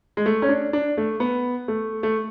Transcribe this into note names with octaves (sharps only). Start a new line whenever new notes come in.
G#3
A3
C#4
D4
D4
A3
B3
A3
A3